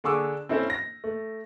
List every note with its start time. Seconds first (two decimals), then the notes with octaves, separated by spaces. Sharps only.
0.04 D3 D4 G#4 C#6 D6 E6
0.49 C4 C#4 E4 A4 C5
0.70 A#6
1.04 A3